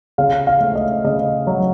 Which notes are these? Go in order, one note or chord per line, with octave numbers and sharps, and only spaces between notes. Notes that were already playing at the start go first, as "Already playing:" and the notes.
C#3 F5
F5
A3
D#5
C#3 D#5
F#3